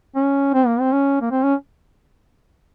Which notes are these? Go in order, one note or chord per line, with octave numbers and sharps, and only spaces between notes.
C#4
C4
A#3
C4
C#4
A#3
C4
C#4